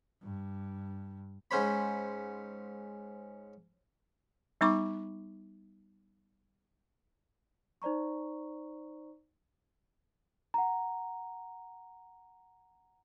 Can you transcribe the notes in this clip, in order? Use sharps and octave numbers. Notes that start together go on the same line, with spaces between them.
G2
G#2 C#4 C5 C#5 B5
G3 B3 D#4 B5 C#6 D6
D#4 C5 D5 A#5 C#6
F#5 A#5